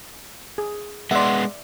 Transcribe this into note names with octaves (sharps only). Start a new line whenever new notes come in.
G#4
G#3 B3 D5 E5 F#5 C6